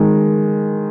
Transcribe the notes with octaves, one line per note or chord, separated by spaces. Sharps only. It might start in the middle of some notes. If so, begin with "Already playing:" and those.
Already playing: D#3 G#3